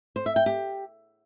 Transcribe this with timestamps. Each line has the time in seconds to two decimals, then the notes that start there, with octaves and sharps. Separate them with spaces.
0.16 C5
0.26 E5
0.36 G5
0.46 G4